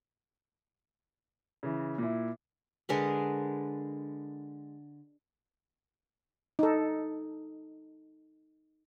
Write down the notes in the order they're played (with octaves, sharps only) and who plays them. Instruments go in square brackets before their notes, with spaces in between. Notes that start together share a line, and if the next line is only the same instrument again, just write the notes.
[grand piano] C#3 E3
A#2 E4
[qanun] D3 G#3 A#4 B4
[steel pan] D#4 A4